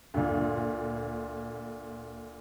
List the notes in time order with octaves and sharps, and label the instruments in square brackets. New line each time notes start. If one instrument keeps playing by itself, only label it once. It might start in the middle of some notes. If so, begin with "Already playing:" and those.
[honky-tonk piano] D2 A#2